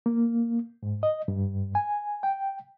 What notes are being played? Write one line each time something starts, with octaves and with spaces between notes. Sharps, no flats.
A#3
G#2
D#5
G2
G#5
G5